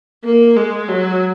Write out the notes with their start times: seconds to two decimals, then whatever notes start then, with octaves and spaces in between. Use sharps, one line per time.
0.25 A#3
0.56 G#3
0.88 F#3